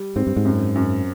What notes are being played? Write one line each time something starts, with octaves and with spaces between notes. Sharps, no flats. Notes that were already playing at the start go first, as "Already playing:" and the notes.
Already playing: G3
G#2 C4
G2
G#2
F#2
F#2